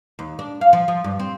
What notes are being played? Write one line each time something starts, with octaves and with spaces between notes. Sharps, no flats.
D#2
D4
F5
F3
F3
G2
C4